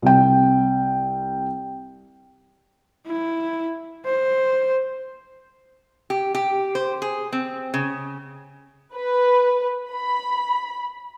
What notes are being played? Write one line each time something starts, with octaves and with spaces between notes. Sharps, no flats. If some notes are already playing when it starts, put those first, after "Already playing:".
C2 G5
E4
C5
G4
G4
C5
G#4
C4
C#3
B4
B5